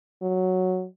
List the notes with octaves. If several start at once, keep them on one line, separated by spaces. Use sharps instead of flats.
F#3